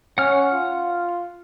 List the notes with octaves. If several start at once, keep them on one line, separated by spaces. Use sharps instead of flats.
C#4 F#5 F6
F4